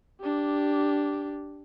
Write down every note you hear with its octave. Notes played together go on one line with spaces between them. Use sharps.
D4 G4